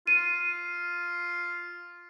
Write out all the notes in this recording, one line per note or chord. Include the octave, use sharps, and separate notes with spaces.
F4 D#7